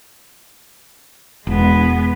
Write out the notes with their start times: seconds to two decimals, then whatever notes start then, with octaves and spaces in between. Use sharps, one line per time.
1.47 E1 G#3 B3